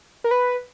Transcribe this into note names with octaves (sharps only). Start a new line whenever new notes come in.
A#4
B4